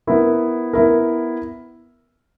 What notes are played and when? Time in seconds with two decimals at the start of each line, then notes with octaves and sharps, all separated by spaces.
0.07 B3 E4 A#4
0.73 B3 E4 A#4